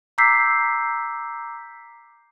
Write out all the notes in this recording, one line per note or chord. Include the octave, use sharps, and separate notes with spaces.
A#5 D6 E6 G6 B6 C7